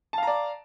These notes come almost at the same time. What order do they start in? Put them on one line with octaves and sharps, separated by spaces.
A5 F5 A#5 D5